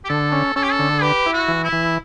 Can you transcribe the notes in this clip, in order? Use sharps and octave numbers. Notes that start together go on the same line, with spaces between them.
G4
D3 A4
C#4
C#4 A4
G4
A4
D3
G4 B4
E4
F#4
E3
E4
E3